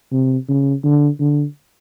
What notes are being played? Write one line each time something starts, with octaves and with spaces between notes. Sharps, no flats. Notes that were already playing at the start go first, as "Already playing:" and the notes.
C3
C#3
D3
D3